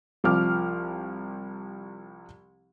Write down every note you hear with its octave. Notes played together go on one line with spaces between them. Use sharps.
C2 F3 D6 F6